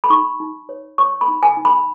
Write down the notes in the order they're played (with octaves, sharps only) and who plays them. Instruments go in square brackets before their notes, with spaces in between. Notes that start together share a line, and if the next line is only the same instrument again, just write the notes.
[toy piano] B5
D#4 C#6
D#4
C#5
C#5 C#6
B5
D#4
G#5
D#4
B5